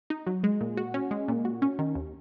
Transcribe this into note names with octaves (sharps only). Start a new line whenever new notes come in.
D#4
F#3
G#3
A#2
F#4
C#4
G#3
A#2
F#4
C#4
D#3
D#2